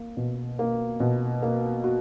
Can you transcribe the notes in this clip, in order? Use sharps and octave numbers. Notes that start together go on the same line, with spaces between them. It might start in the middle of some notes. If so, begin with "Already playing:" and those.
Already playing: A#3
B2
A#3
B2
A#3
F#4